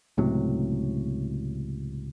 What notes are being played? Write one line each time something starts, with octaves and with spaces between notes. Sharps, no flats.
C#2 A2 C3 F#3